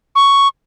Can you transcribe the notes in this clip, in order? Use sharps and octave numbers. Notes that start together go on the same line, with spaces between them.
C#6